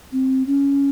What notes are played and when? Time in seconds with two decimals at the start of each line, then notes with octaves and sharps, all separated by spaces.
0.12 C4
0.47 C#4